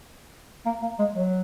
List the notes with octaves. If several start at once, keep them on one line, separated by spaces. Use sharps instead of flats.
A#3
A#3
G#3
F#3